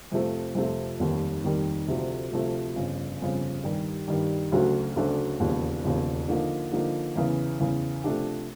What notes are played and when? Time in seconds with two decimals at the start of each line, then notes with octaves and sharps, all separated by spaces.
0.12 F2 C3 F3 A3 C4
0.55 F2 C3 F3 A3 C4
0.99 F1 D#2 D#3 G3
1.44 F1 D#2 D#3 G3
1.88 D2 C3 F3 A3
2.32 D2 C3 F3 A3
2.76 G1 F2 C#3
3.20 G1 F2 C#3
3.63 G2 D#3 G3
4.08 G2 D#3 G3
4.52 D2 C#3 F#3 A3 D4
4.96 D2 C#3 F#3 A3 D4
5.40 E1 D#2 C#3 F3
5.84 E1 D#2 C#3 F3
6.28 D3 F3 A#3 D#4
6.72 D3 F3 A#3 D#4
7.16 E2 C#3 E3
7.60 E2 C#3 E3
8.04 C3 F3 A3 D4 G4